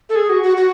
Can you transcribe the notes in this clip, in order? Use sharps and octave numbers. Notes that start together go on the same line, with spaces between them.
A4
G#4
F#4
F#4
F#4